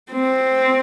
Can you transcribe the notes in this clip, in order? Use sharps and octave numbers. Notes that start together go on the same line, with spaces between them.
C4